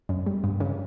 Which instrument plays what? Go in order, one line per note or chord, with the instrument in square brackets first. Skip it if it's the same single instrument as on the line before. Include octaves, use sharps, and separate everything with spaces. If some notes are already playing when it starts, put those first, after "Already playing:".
[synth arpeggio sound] F#2
G3
G2
C#3